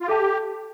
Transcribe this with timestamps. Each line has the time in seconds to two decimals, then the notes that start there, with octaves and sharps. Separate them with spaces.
0.01 F4
0.08 G4 A4 E5 A5